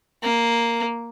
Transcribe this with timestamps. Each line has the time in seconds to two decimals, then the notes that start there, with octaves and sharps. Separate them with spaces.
0.23 A#3